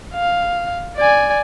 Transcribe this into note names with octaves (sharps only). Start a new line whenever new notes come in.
F5
D5 G#5